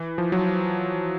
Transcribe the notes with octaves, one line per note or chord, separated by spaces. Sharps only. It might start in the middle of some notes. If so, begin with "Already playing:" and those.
Already playing: E3
F3
F#3